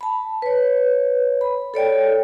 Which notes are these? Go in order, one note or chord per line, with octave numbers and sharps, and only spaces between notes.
A5 B5
B4 C#5
B5
A4 C#5 D5 G5